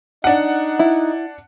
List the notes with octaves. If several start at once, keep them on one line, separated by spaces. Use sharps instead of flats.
D4 D#4 F#5
E4